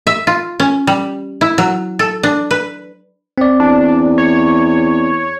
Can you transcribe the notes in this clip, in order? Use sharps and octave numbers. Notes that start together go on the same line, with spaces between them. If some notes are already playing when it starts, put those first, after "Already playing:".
E5
F4
C#4
G3
E4
F#3
A4
D4
B4
C4 D5
E2 D4
C#5